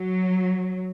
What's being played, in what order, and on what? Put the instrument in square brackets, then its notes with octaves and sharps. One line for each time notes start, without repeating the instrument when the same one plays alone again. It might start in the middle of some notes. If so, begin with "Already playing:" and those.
Already playing: [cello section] F#3